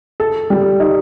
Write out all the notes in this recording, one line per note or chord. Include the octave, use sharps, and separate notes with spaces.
A4
G3
D#4